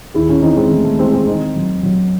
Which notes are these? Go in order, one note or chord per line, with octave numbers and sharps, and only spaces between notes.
D#2 E4 G#4
C#4 E4
E3 C4 D#4
G#3 C4
E3 A3
A3
E3 G#3 C4
G#3 C4
D#3 C4 D#4
F#3
F#3